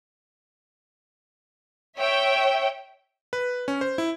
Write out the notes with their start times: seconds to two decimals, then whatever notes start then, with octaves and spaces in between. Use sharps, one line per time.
1.98 C#5 E5 G5
3.33 B4
3.68 C#4
3.81 C5
3.98 E4